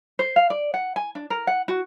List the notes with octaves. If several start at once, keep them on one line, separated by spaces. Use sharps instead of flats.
C5
F5
D5
F#5
G#5
D4
A#4
F#5
F#4